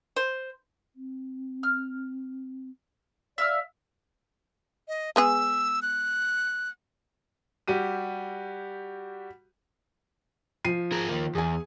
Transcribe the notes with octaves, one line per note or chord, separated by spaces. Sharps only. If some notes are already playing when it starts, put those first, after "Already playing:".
C5
C4
F6
D5 E5 F5 E6
D#5
G#3 B3 G#4 E6
F#6
G3 F#4 G4 D#7
F3 C7 D#7
G#4 A#4
D#3 A#3
E2 G#4 G#5